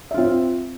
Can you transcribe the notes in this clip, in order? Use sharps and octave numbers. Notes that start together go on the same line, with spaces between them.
C4 F4 E5